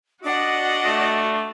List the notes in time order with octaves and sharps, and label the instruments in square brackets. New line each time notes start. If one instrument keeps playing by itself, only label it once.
[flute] D4 [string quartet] F#4 D5 F#5 [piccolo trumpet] D#5
[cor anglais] A3